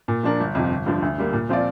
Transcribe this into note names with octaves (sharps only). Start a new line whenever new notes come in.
A#2
F3 D4 A#4
G1
F2 C3 F3
G1
G2 D3 F3
D2
D3 G3 A#3
A#2
F3 C4 F4 D5